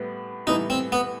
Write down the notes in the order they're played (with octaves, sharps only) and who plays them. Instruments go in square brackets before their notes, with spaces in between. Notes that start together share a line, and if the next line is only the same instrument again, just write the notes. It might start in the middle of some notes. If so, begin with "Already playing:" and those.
Already playing: [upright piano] A2 G3 B3
[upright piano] A2 E3 G3 B3 [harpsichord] D#4
[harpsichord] C4
B3